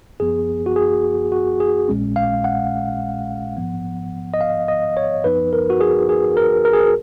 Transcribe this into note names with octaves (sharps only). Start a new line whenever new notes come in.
F#2 F3 B3 G#4
F#4
G#4
F#4
G#4
A#1 A#2 G#3 C#4
F5
F#5
G#2 F3 B3
D#5
F5
D#5
C#5
F#2 F3 B3 D#4 B4
A#4
F#4
G#4
G#4
A#4
A#4
G#4
A#4